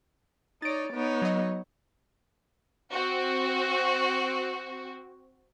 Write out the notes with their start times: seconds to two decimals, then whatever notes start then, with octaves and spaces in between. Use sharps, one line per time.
0.62 D#4 C#5 D5 A6 D7
0.92 B3 D#4 C#5
1.22 F#3 D#5
2.93 C4 F#4